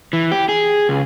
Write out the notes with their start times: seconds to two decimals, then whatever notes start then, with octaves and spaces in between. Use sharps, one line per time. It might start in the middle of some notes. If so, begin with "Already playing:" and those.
0.13 E3
0.31 G4
0.49 G#4
0.89 C#2